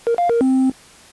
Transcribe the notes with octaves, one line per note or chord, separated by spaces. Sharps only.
A#4
F5
A#4
C4